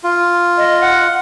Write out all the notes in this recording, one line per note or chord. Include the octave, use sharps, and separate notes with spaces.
F4
D#5
F#5